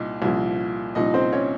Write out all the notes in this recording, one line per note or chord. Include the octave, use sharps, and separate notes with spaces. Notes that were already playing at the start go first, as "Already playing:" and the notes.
Already playing: C2 A#2 D#4
C2 A#2 F3
C2 A#2 F3 D#4 D#5
C4 C5
C#4 C#5